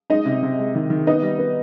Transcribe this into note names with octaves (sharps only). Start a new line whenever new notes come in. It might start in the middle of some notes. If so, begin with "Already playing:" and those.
G#3 D#4 D#5
C3
C3
G#3
D#3
D#3
B3 D#4 D#5
G3
B3